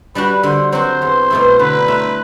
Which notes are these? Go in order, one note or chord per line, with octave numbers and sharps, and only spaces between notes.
G3 D4 F#4 B4
D3 C5
F#3 C4 F#4 C5
E2
B2 A3 E4
D3 B4
A3 E4